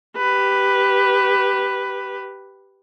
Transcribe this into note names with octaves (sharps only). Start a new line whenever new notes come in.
G4 B4